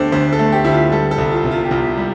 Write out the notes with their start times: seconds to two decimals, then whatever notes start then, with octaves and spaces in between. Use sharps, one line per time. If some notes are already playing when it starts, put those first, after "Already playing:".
Already playing: D2 D3 A3 G4 C5 D5
0.12 D2 C5
0.32 A4
0.39 A3
0.52 G4
0.64 D2 E4
0.72 F4
0.92 G3 A4
1.11 A4
1.18 C2
1.31 F4
1.44 C3
1.51 F4
1.65 G4
1.71 C2 F4
1.97 G3